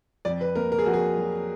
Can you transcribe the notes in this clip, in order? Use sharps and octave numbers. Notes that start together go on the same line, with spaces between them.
F2 D5
B4
A#3 A#4
A#4
G#4
F2 F#4
G#4
F#3